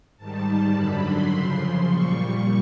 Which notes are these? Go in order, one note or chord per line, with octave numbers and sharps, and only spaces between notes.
G#2 D#3 G3 A5
F#2 D3 F#3 B5
C6
F#2 C#3 F3
C6
A#2 G3 C#6